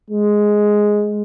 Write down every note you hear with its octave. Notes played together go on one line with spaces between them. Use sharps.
G#3